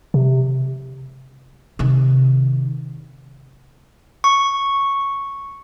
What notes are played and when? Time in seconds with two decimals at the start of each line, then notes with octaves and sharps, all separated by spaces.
0.14 C3
1.79 C3 D#3
4.24 C#6